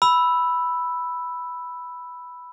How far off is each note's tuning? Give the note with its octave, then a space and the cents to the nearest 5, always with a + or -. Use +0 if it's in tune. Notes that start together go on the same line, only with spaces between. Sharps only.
B5 +0 E6 +0